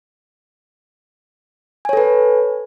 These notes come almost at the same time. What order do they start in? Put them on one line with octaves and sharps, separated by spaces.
G#5 C#5 A4 B4